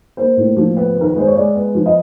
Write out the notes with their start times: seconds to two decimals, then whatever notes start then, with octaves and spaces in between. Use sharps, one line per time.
0.17 A#3 C5
0.37 A2
0.57 F3
0.77 B3
0.96 D#3 A#4
1.10 B4
1.16 G#3 C5
1.27 C#5
1.36 G#3 D5
1.55 B3
1.75 F3
1.86 D#5